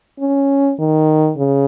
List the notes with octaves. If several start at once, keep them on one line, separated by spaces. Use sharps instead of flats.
C#4
D#3
C#3